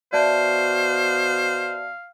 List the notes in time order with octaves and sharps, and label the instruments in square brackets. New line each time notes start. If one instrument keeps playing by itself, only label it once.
[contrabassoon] B2 [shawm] C5 [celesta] D5 E5 A5 [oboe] F5